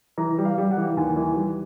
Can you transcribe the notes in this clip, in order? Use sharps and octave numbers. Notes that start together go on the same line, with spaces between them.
E3 A#5
G3
F5
G3
F#5
E3
D#2 G#5
E3
G3